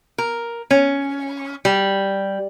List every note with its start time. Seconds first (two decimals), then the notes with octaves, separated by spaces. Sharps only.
0.18 A#4
0.71 C#4
1.65 G3